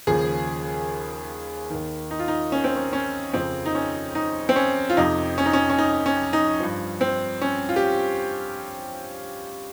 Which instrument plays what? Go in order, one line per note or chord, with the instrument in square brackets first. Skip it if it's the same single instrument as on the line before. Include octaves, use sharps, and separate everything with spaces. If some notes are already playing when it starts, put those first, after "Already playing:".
[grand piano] D#2 C#3 F3 G#4
D#2 D#3
D#4
F4
D#4
C#4
C4
C#4
C#4
F2 C#3 F3 C4
D#4
C#4
D#4
C4
C#4
F4
F2 C3 F3 D#4
C#4
D#4
C#4
C#4
D#4
C#4
D#4
G2 F3
C4
C#4
F4
G4